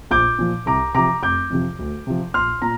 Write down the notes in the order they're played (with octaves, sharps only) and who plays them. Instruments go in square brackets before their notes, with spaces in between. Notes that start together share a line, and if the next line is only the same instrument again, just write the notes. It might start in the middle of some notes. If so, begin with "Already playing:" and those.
[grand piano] A#1 D6 G6
A#2 F3
C2 A#5 D6
C3 F3 A#5 D6
F1 D6 G6
F2 C3 F3
D2
C3 F3
A#1 C6 F6
A#2 A#5